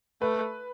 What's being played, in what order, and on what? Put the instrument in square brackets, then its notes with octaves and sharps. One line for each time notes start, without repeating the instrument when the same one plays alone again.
[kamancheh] A3 [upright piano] B4